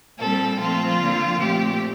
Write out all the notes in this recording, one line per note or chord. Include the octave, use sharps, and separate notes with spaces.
A#2 G3 C4 A4
A#2 F3 A3 C4 F4
D3 F3 A#3
A#2 A3 C4 G4